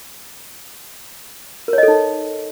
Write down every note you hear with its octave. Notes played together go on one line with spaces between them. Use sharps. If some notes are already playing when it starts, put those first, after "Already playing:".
D#4 A4 A#4 C#5 D#5